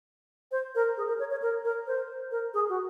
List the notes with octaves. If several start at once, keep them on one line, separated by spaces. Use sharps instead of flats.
C5
A#4
G#4
A#4
C#5
C#5
A#4
A#4
C5
A#4
G#4
F#4